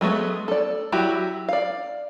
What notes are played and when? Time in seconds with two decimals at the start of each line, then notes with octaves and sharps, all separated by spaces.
0.01 F#3 G#3 A3 B3
0.48 A4 D5
0.92 F#3 E4 F#4 G4
1.49 D5 F5